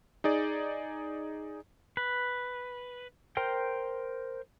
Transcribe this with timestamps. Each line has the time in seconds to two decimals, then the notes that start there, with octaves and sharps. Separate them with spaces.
0.24 D#4 G#4 D5
1.97 B4
3.37 A#4 C5 G5